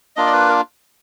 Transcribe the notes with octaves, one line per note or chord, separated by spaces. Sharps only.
A#3 D4 F4 D#5
D5
B4
A#4